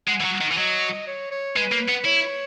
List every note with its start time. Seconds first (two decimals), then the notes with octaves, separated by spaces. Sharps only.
0.08 G#3 F#5
0.21 E3
0.25 F#3
0.41 D#3
0.51 E3
0.58 F#3 D#5
1.07 C#5
1.31 C#5
1.56 G#3 B4
1.72 A#3
1.89 B3
2.05 E4 C#5